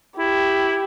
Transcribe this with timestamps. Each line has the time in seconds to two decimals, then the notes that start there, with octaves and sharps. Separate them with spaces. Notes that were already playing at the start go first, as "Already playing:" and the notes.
0.18 E4 G4